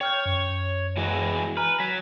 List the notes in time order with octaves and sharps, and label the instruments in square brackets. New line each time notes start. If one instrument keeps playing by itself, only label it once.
[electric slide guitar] C#5 [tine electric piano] G5 F6 G6
[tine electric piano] F#2
[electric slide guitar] E3 G#3 F#4
[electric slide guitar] B4 [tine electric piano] G#5 A#5 F6
[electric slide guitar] F#3 [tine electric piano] B6